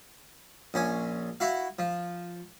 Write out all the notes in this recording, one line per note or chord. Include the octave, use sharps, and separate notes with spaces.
A#1 C#4 G#5
E4 F#4 F5
F3